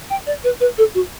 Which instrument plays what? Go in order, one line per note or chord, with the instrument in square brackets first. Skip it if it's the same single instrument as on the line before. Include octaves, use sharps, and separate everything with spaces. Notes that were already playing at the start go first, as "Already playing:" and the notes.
[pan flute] G5
D5
B4
B4
A4
F#4